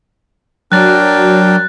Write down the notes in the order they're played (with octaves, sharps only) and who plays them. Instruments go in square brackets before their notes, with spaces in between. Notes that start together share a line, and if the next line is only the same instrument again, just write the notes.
[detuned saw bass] F#3 [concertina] D4 A#4 G5 [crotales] F#6 A6